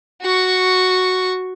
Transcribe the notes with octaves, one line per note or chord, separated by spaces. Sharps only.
F#4 C#6